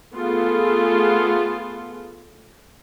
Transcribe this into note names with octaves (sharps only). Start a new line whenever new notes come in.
A3 B3 F4 G#4 A4